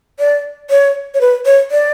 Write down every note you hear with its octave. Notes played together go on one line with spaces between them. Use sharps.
D5
C#5
C#5
B4
C#5
D5